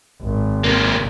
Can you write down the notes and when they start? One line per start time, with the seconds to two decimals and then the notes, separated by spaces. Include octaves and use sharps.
0.21 G#1
0.64 C3 A#3